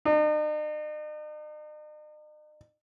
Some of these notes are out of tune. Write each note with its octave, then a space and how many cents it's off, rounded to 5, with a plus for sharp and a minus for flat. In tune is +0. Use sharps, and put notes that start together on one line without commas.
D#4 -45